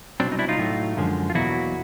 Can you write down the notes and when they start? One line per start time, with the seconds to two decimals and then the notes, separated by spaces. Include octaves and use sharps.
0.20 C2 B2 F#3 C4 D4
0.32 D#4
0.39 D4 E4
0.49 D#4 F4
0.59 A2 F#3 A3
0.97 F#2 D3 F3 G#3
1.30 F4
1.34 E2 B2 F#3 A#3 E4 F#4